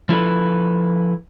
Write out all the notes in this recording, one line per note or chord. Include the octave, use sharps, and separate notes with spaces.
F3 E4 A4 B4